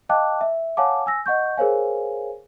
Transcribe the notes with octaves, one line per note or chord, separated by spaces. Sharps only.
D#5 F5 G5 A5 D6 F#6
E5
C#5 F5 F#5 G#5 A5 D6
G#5 E6 A#6
D#5 F#5 C#6 G6
G#4 A#4 C5 C#5 F5 G#5